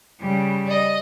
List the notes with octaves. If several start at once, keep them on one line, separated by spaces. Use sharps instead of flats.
C#3 G3
D5 D#5